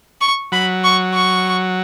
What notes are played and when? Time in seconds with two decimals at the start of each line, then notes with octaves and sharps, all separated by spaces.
0.21 C#6
0.52 F#3 B5
0.84 C#6
1.14 C#6